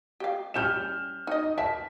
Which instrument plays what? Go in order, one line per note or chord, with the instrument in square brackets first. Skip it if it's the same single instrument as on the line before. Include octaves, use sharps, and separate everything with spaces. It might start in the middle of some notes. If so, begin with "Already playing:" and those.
[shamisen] G4 F5
[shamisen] G3 C#4 E4 [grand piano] F6 G6 E7
[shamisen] D#4 D#5
[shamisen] A#4 E5 A5 [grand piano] B6